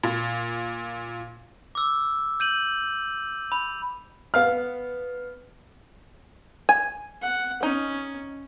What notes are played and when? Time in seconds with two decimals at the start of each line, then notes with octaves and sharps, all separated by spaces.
0.03 A#2
1.75 D6 E6
2.40 G6 D#7 F#7
3.52 B5
4.34 B3 F5 F6
6.69 G#5
7.22 F#5
7.63 C#4 D#4